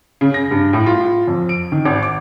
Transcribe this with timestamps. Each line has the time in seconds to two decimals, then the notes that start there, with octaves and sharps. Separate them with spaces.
0.21 C#3
0.34 A#6
0.51 G2
0.73 A2
0.86 F4
1.07 F4
1.28 F2
1.49 D7
1.72 D#3
1.85 G#1
2.03 D6